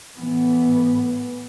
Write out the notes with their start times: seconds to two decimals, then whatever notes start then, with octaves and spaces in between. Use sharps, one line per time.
0.18 A2 E3 B3